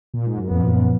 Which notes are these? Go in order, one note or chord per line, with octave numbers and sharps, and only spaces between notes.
A#2
G#2
F#2
F2 A#2 F3 B3
F#2
F#2